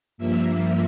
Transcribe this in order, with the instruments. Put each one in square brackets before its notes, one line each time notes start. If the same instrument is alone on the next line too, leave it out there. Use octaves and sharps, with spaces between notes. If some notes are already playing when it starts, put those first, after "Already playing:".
[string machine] G2 F3 A#3 E5